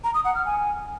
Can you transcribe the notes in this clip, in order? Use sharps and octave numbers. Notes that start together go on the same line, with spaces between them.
A#5
D#6
F#5
F6
G#5